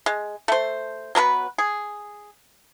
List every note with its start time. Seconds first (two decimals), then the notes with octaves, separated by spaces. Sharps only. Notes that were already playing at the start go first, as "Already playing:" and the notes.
0.06 G#3
0.48 A3 C5
1.15 F#3 B3 A#4 B4
1.58 G#4